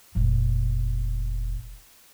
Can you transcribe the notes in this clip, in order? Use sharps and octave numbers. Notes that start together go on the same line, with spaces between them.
F1 A#2